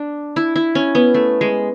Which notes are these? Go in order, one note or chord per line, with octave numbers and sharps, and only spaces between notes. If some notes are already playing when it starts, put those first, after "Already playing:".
Already playing: D4
E4
E4
C#4
B3
A3
G#3